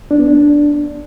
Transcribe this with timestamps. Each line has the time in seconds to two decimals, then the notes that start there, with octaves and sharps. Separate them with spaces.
0.11 D4
0.19 B3
0.28 D4